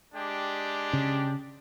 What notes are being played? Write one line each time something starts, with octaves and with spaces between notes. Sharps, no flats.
G#3 D4 G4
C#3